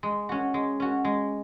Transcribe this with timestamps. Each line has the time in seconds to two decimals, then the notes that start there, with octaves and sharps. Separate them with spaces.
0.03 G#3
0.29 C#4 F#4
0.54 G#3
0.80 C#4 F#4
1.05 G#3